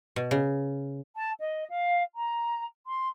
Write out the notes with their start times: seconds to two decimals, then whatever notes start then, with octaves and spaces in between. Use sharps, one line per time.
0.16 B2
0.31 C#3
1.16 A5
1.39 D#5
1.71 F5
2.15 A#5
2.88 C6